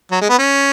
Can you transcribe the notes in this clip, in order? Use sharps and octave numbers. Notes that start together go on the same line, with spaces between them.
F#3
G#3
B3
C#4